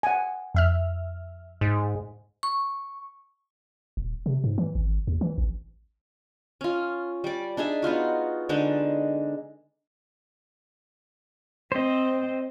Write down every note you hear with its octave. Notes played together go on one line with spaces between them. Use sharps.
F#5 G#5
F2 E5 F6
G#2
C#6
D#1
C3
G#2
E3
G#1
D#2
E3
A1
C#4 F4
G3 D5
D4 D#4 G#4 E5
B3 D#4 F4 F#4
D3 G#3 D4 D#4
C4 C5 D#5